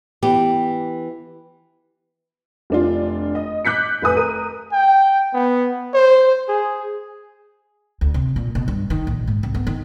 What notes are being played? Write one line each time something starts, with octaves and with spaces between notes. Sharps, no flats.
E3 B3 G4
F1 D4 F4
D#5
D6 F#6 G6 B6 C#7
F1 B4 G#5 D#6
A#4 D#7
G5
B3
C5
G#4
D2
C3
A#2
B2
G2
D#3
A#1
G#2
C2
B3
D#3